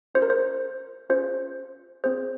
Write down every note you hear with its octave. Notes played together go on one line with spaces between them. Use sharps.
C#4 F4 G#4 C5
A#4
C5
C#4 F4 G#4 C5
C4 F4 G#4 C5